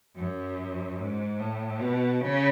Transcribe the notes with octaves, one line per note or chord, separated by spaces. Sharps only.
F#2
G#2
A2
B2
C#3